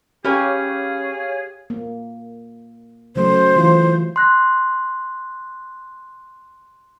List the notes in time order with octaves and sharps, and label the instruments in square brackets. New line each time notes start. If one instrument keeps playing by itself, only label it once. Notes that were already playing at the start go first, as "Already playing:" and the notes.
[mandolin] C#4 B4 G#5 [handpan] G4 [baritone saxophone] G#4 [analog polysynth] C#5 F5
[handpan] A#3
[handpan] C#3 F#3 A3 [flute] C5
[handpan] E3 F4
[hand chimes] C6 F#6 A#6